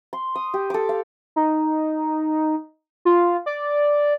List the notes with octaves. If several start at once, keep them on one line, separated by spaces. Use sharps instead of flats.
C6
D#6
G4
A4 D6
F5
D#4
F4
D5